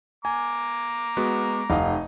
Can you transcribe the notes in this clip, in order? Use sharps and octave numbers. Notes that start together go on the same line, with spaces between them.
G#5 A#5 D6
G#3 B3 F#4
F1 D#4 D#5 F5